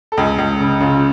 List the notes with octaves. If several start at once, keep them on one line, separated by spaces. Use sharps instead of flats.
A4
C#2 G#4
C#2
C#3
C#3 F4